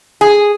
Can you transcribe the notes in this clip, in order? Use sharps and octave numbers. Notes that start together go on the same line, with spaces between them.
G#4